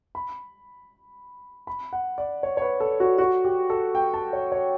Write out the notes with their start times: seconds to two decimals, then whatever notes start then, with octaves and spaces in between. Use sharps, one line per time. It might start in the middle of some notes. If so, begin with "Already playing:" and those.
0.15 B5
1.67 B5
1.93 F#5
2.18 D5
2.43 C#5
2.57 C#5
2.62 B4
2.80 A4
3.00 F#4
3.18 F#4
3.44 G4
3.70 A4
3.95 G5
4.14 A5
4.33 C#5
4.52 C#5